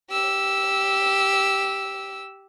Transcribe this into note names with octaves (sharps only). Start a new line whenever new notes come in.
G4 E6